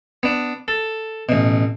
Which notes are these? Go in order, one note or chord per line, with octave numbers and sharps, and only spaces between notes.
B3 D4
A4
A1 B2